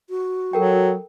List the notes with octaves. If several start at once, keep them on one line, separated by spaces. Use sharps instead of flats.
F#4
F#3 A4 A#4 G5